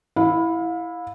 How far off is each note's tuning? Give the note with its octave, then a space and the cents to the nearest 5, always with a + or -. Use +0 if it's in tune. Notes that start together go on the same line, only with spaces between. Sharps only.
E4 +0 F5 +30